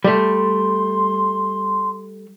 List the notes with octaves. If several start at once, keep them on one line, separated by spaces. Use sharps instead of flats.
G3 A3 C6